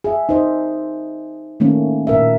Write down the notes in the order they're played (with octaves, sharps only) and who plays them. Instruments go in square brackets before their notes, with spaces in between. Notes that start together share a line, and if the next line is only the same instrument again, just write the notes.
[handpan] G#4 E5
D#4 C5 D#5
D#3 A3 A#3 C#4
A#2 A#4 E5